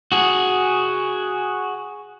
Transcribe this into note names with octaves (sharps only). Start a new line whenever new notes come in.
F#4 G#4